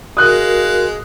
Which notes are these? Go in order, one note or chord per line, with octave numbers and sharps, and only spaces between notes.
G#3 F#4 A#4 F5 D#6 F#6